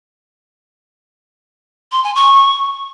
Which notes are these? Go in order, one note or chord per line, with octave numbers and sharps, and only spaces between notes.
C6
G#5
C#6